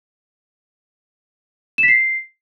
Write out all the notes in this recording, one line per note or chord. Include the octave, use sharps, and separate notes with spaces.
E7
B6
C7